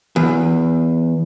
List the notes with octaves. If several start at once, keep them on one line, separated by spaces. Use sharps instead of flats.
E2